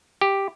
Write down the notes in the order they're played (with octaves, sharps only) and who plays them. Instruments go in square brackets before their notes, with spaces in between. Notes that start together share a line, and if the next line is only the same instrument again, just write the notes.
[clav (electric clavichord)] G4